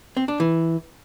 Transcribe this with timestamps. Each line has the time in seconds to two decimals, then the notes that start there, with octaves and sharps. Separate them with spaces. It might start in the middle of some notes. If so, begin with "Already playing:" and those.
0.17 C4
0.28 D4
0.40 E3